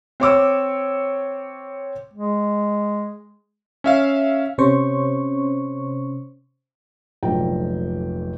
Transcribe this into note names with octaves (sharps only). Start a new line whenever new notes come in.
C4 C#5 D6 E6
G#3
C#4 E5 F5
C3 C#4 C5 C#6
F1 A#1 F2 F#3 G5 A#5